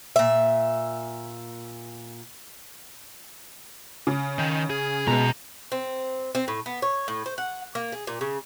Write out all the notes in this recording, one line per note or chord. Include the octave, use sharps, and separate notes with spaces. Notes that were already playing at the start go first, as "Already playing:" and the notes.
A#2 E5
C#3
D#3
G#4
B2 G#3 C#4 A#5
C4
C4
A2
B3
C#5
A2
C5
F#5
A#3
G#4
A#2
C#3